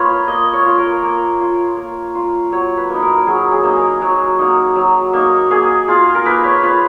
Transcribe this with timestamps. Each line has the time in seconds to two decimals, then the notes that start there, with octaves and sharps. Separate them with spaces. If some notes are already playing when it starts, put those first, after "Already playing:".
Already playing: A#3 F4 B4 C#5 D#5
0.28 A#3 D#5
0.53 C#5
0.66 F4
0.78 A#4
1.03 A#3
1.40 F4
1.77 A#3
2.15 F4
2.51 F#3 C#5
2.77 B4
2.89 A#3 D#4
3.02 A#4
3.27 F#3 G#4
3.52 G#4
3.63 A#3 D#4
3.76 G#4
4.01 F#3 F#4
4.39 A#3 D#4
4.75 F#3
5.13 A#3 D#4
5.50 A#3 G#4
5.88 F4 G#4
6.15 A#4
6.26 A#3 B4
6.44 C#5
6.63 F4 B4